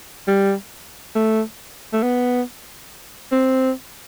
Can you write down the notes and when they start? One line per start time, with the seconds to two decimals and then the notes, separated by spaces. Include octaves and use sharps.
0.28 G3
1.15 A3
1.93 A3
2.02 B3
3.32 C4